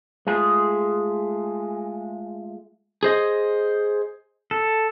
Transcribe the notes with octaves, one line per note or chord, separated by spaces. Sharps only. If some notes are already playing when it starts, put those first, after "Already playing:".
G#3 A3 F4 G#4
G#4 C5 D#5
A4